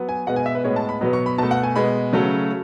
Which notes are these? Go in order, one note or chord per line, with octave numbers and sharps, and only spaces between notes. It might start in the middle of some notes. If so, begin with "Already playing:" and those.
Already playing: F#3 B3
G#5
B2 G#3 B3 F#5
G#5
E5
B4
A2 G#3 B3 C#5
A5
B5
B2 F#3 B3
C#6
B5
B2 A3 A5
F#5
G#5
B2 G#3 B3 B5
C#3 F#3 A3